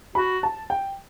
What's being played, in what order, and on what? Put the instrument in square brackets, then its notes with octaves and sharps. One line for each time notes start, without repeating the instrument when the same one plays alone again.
[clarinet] F#4 [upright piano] B5
[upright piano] A5
G5